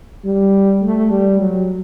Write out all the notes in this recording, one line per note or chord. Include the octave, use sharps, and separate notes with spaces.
G3
A3
G3
F#3